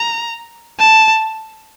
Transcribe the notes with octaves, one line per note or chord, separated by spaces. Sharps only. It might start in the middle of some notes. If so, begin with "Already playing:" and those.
Already playing: A#5
A5